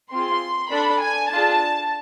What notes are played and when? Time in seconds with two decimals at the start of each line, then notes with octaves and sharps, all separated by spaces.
0.11 C4 F4 G#4 C6
0.71 D4 A4 B5
1.01 G#5
1.30 D4 F4 G#4 A5